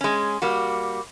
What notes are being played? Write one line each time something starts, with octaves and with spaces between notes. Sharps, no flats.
G#3 C#4
G3 A#3 F#4